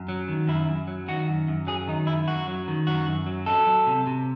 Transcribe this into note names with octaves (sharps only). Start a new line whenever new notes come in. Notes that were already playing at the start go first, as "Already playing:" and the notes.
Already playing: F#2
F#3
D#3
F#2 E4
F#2
F#3
D#3 F#4
F#2
F#2
F#3 G#4
D#3 D#4
F#2 E4
F#2 F#4
F#3
D#3
F#2 F#4
F#2
F#3
F#3 A4
F#3
C3
C3